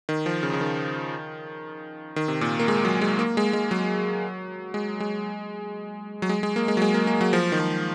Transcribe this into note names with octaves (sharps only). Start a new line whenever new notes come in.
D#3
F3
C#3
C#3
D#3
D#3
C3
A#2
A#3
G#3
F#3
G#3
A#3
G#3
G#3
F#3
G#3
G#3
F#3
G#3
G#3
A#3
G#3
F#3
G#3
A#3
A#3
F#3
F3
D#3
F3